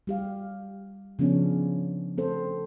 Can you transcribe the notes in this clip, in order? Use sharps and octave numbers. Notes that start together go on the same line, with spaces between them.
G3 G4 F5
C#3 F3 B3 C#4 D4
C4 A4 C5